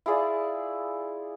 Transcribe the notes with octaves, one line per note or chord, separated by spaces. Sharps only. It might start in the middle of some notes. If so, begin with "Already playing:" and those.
E4 F4 G#4 D5